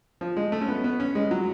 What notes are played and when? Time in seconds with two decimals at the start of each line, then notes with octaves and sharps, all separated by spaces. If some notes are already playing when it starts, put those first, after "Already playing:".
0.21 F3
0.37 G#3
0.52 A3
0.61 C#4
0.68 B3
0.84 B3
1.00 C#4
1.15 G#3
1.31 F#3